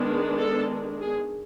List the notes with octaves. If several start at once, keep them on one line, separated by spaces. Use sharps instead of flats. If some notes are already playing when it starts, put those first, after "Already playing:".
Already playing: D#3 G#3 B3 D4
A4
G#4